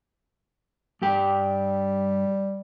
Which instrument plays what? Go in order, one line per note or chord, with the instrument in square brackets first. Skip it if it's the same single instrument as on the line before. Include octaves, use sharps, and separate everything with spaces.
[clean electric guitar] G2 G4 G5 [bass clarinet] G3